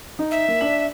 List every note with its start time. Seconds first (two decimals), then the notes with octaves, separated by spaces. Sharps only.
0.19 D#4
0.31 E5
0.48 A#3
0.61 D4 B6 F#7